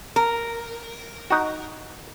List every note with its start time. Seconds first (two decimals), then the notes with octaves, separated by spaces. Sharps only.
0.16 A#4
1.30 D#4 F#4